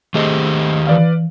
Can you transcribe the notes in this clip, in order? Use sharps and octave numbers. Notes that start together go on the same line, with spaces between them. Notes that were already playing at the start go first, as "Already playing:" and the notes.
D#3 A3 G4 G#4 C5 D#5
E3 B4 D5 F5